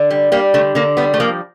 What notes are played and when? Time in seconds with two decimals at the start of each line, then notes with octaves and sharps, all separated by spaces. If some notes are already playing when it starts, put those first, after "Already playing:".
Already playing: D3
0.10 G3
0.32 G3 A#3
0.54 D3 A3
0.75 D3 A#3
0.97 G3 B3
1.14 A3
1.20 F3 A#3